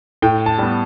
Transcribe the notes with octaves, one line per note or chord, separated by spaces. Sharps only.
A2 G5
A5
G3 B3